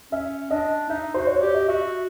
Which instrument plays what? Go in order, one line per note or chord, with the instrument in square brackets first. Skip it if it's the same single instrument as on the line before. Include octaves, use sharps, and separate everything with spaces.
[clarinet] C#4 [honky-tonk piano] E5
[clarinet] D4 [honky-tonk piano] D#5
[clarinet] D#4 [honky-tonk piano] E5
[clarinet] F#4 [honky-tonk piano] C5
[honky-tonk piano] C#5
[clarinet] G4 [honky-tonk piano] D5
[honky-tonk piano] D#5
[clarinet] F#4 [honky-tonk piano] E5